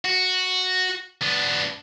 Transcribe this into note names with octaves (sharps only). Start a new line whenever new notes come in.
F#4
B3 D4